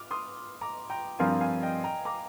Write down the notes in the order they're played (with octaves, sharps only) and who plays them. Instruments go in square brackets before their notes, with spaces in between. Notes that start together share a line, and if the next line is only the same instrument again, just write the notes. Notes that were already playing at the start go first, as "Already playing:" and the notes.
Already playing: [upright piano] D6 F6
C6 D#6
A#5 D6
G5 A#5
[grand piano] G2 F3 C4 F4 A#4 [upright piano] F5 G#5
[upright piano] F5 G#5
D#5 G5
G5 A#5
A#5 D6